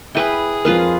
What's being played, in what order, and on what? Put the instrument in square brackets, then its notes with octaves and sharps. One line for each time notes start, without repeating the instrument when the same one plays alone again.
[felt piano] E4 [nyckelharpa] G#4 [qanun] B4 G5
[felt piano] F2 A#4 [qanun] F4 B4 F5